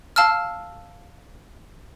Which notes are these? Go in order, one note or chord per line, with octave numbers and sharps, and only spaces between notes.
F5 A5 E6 F6